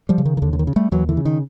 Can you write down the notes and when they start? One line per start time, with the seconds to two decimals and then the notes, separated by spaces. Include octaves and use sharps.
0.09 F3 G3
0.18 C#3
0.25 D#3
0.37 D#3
0.42 D#2 D3
0.53 D3
0.59 D#3
0.67 C#3
0.76 G3 A3
0.92 D#2 E3 F#3
1.09 D3 E3
1.17 C#3
1.25 D#3